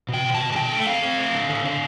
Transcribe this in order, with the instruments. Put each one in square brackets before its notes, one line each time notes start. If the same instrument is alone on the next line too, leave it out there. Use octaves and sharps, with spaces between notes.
[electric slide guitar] B2 G5
B2
A5
B2
A5
D3 G5
A3
C4 F5
C4
A3
D3
D3
D3